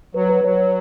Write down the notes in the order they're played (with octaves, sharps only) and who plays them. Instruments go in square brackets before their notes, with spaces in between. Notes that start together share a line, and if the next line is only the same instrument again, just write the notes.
[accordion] F#3 [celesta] B4
[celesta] B4
[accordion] F#3 [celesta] C#5